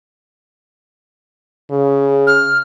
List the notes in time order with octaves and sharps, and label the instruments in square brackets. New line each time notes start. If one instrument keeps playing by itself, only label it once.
[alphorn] C#3
[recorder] F6